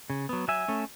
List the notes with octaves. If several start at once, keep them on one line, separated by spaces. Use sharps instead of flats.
C#3
F#3 B3
F#3 E5 G#5
A3 C#4